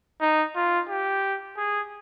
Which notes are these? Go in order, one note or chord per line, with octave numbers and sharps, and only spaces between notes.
D#4
F4
G4
G#4